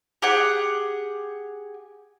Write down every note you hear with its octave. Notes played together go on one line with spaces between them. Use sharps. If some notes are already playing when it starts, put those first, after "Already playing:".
G4 G#4 F#5